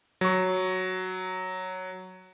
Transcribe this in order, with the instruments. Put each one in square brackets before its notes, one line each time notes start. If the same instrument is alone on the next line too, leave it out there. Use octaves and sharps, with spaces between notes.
[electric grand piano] F#3 C#6